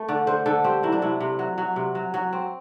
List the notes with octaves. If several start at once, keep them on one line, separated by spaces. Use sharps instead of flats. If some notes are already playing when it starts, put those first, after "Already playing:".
Already playing: A3
D3 D5
D3 C5
D3 A4
C4 G4
F#3 E4
D4
C3 E4
C3
F#3
F#3
C3
F#3
F#3
C4